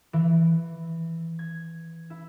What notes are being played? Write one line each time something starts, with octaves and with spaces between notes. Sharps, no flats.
E3
G#6
E4